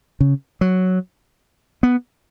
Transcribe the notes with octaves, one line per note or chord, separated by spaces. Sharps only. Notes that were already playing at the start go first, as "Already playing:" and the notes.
C#3
F#3
B3